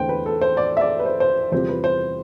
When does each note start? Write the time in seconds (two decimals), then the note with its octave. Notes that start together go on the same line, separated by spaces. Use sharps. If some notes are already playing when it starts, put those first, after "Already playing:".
Already playing: E2 D3 A3 C5 G5
0.09 B4
0.26 A4
0.41 C5
0.57 D5
0.77 E5
0.81 D5
1.00 B4
1.05 C5
1.20 C5
1.52 E2 C3 G3 C4 F4 C5
1.69 B4
1.84 C5